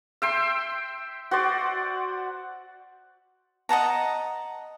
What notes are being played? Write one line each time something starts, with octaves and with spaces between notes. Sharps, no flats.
E5 G5 C6
F#4 C5 D5
D#5 F#5 A5 A#5